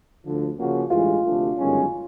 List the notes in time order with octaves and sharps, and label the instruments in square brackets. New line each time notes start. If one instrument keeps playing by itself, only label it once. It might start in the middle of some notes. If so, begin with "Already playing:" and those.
[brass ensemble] D2 D3 F3
C#3 F3 A#3 C#4 F#4
[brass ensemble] A1 G2 E3 G#3 [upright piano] F4
[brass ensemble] D2 C3 F3 A3 D4
G1 F#2 D#3 G#3 C#4